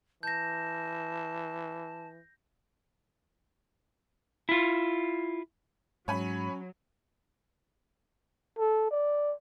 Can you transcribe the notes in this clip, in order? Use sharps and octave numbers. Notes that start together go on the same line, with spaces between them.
E3 A5 G6 A#6
E4 F4
G#2 F#3 C#4 C#5 G#5 B5
A4
D5